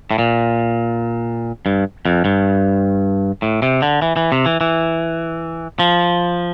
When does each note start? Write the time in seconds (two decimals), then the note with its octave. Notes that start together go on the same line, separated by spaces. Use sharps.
0.11 A2
0.19 A#2
1.66 G2
2.05 F2
2.25 G2
3.42 A2
3.62 C3
3.82 D3
4.02 E3
4.17 E3
4.32 C3
4.46 E3
4.61 E3
5.79 F3